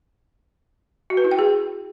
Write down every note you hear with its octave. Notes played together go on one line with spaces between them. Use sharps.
F#4
B4
E4
G5
G#4